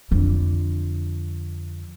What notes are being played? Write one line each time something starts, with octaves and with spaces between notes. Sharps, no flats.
F2 D3